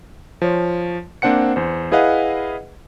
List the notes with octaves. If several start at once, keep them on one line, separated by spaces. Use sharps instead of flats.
F3 C#5
A#3 C4 D4 C5 F#5 C#7
E2 C5
E4 G#4 B4 D#5 F5 F#5